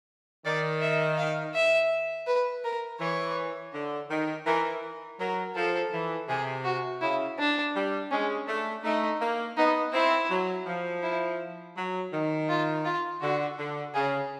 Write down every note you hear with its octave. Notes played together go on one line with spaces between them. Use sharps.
D#3 D5
E5
F5
E5
B4
A#4
E3 C#5
D3
D#3
E3 A#4
F#3 A#4
F3 A4
E3
C3 G#4
F#4
C#3 E4
D4
G3
G#3 C#4
A3 D4
A3 D#4
A#3
B3 D#4
C4 E4
F#3
F3
E4
F#3
D#3
F4
F4
D3 F#4
D3
C#3 G#4